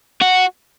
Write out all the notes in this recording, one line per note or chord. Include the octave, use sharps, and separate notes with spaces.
F#4